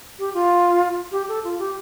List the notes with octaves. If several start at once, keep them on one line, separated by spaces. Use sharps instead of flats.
G4
F4
G4
A4
F4
G4